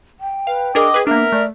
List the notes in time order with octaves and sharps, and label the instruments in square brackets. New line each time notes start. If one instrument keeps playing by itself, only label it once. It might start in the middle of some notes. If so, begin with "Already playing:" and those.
[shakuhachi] G5
[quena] B4 [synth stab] F5
[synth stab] D4 G#4 A#4 [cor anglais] D#5 [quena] D6
[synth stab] G#4 B4
[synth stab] A#3 D4 [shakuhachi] B3 [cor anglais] A#4 [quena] E5
[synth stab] A3 [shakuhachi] D5